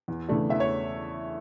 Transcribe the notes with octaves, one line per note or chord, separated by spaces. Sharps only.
E2
C#3 E3 A3 D4
E2 E5
C#5